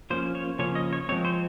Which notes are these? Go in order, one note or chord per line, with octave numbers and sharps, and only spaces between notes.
F3 A#3 C#4 C5
C#5
C#3 F3 A#3 C#4 C#5
D#5
C#5
F3 G#3 C4 C#5
C5